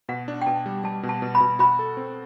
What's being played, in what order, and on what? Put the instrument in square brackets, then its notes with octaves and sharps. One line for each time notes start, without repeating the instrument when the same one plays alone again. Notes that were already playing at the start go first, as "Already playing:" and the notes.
[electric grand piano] B2 [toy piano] F#5
[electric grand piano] D4
[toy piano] G5
[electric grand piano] B2 [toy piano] A5
[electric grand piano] G3
[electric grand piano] G3 [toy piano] A5
[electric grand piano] B2
[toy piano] A5
[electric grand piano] B2
[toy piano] B5
[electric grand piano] B2
[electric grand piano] F#4 [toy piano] B5
[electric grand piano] A4
C4